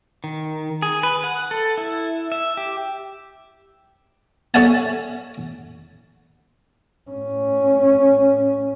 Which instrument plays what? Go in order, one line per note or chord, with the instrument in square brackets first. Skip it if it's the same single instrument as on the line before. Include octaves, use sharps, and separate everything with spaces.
[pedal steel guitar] D#3
G#4
B4
F#5
A4
E4
E5
G4
[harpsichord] A4 C#5 E5 F#5 G#5 A5
[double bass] A2 C#4